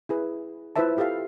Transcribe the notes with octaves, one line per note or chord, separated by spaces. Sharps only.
E4 G#4 B4
E4 F4 B4 C5 E5 A5
F4 G4 A4 E5 F5